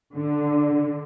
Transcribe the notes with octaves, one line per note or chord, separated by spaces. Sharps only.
D3